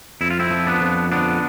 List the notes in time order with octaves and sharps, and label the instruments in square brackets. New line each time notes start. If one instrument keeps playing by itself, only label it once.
[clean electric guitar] F2 E4
F4
C4 E4
F3
B3 D4
F2
D3 B3 D4